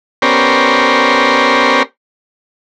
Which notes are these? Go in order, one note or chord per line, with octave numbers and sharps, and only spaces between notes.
B3 C#4 G4 A#4 C5 D5